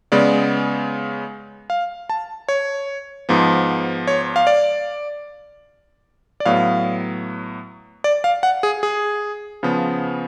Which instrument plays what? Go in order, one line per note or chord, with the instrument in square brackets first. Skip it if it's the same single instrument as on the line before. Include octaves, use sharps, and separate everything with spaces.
[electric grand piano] C#3 G#3 B3 D5
F5
A5
C#5
G#2 F3 B3
C#5
F5
D5
D5
A2 F#3 B3 F5
D5
F5
F#5
G#4
G#4
C#3 F3 B3